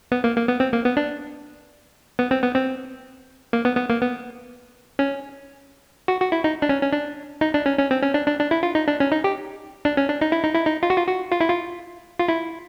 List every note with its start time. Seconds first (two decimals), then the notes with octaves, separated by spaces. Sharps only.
0.12 B3
0.24 A#3
0.37 A#3
0.48 B3
0.60 C4
0.73 A#3
0.85 B3
0.97 D4
2.19 B3
2.31 C4
2.43 B3
2.55 C4
3.53 A#3
3.65 B3
3.77 B3
3.90 A#3
4.01 B3
4.99 C#4
6.08 F#4
6.20 F#4
6.32 E4
6.44 D#4
6.62 D4
6.69 C#4
6.82 C#4
6.93 D4
7.41 D#4
7.54 D4
7.66 C#4
7.79 C#4
7.91 C4
8.03 C#4
8.14 D4
8.27 D4
8.40 D4
8.51 E4
8.63 F4
8.75 D#4
8.88 D4
9.00 C#4
9.12 D#4
9.24 G4
9.85 D4
9.97 C#4
10.09 D4
10.21 D#4
10.32 E4
10.44 D#4
10.55 E4
10.66 D#4
10.83 F4
10.90 F#4
10.97 F4
11.07 F#4
11.32 F4
11.40 E4
11.50 F4
12.19 F4
12.28 E4